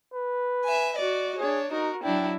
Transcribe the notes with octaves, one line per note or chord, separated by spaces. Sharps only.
B4
E5 G#5
F#4 D5 D#5
D4 G#4 C#5
D#4 F#4 A#4
F#3 D4 E4 G5